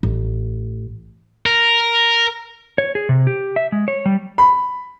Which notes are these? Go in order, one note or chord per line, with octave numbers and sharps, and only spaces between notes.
A1
A#4
C#5
G#4
C3
G4
E5
G#3
C#5
G3
B5